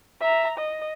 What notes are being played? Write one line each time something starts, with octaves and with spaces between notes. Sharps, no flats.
E5 A#5
D#5